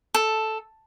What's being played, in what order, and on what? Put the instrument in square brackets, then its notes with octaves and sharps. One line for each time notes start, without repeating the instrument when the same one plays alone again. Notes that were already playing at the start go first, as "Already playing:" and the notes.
[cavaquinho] A4